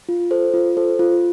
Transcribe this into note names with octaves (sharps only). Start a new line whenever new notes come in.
F4
A4 C5
F4
A4 C5
F4